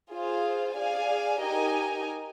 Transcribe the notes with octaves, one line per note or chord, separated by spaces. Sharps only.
F4 G#4 C5 F5
G#4 D5 F5 G#5
D#4 G4 A#4 D#5 G#5